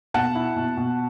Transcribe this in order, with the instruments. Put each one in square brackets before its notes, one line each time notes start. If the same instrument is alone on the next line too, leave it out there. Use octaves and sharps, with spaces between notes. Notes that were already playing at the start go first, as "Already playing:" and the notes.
[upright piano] B2 F#5 A5
E4
B2
B2